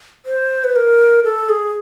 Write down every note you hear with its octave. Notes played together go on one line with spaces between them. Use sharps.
C5
B4
A#4
A4
G#4